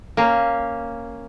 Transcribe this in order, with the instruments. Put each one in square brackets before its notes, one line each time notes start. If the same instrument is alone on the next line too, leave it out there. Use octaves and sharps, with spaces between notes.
[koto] A#3 C#4